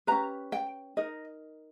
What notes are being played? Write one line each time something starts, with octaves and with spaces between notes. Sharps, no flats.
C#4 G4 B4 A#5
G5
D#4 A#4 D#5